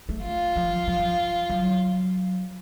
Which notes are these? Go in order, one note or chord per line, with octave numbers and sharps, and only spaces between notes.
A3
F4
F3
F3
F#3